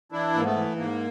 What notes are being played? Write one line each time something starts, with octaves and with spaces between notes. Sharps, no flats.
E3 D4 E4
G#2 A#3
A3 B3
E3
G#2 A#3